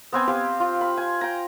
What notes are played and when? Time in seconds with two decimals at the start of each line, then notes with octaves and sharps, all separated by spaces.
0.13 B3 C4 G#5
0.28 G4 C5 F5
0.60 F4
0.81 B5
0.97 G#5
1.21 G5 A#5